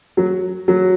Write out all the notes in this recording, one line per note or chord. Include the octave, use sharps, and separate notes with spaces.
F#3
F#3